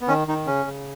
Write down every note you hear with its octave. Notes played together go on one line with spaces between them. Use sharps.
B3
D#3 C#4
D#3 D#4
C#3 C#4
C#3